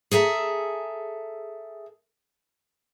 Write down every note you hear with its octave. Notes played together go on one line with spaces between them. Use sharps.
G#4 A4 E5 A#5